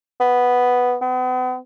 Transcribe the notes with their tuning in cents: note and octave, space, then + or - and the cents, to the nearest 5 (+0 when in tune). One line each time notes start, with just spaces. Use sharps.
B3 +0
B3 +40